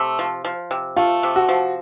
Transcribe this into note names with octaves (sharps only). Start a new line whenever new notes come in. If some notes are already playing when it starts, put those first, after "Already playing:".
Already playing: C3 A3
F3
F3
C3
A3 F4
C3
F#4
F3